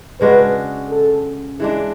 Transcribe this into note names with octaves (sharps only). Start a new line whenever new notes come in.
C#3 G#3 D4 F#4 B4
A4
E3 G#3 D4 G#4